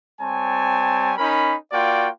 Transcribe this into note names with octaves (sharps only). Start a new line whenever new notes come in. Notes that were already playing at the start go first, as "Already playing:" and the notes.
G3 C4 C#5 G#5 A5
C#4 D#4 A#4 B5
A#3 F4 F#4 D5 G5